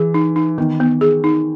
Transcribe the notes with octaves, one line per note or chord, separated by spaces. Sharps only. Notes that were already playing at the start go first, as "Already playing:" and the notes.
Already playing: E3 G#4
D#4
D#4
D#3 B3
B3
G#4
D#4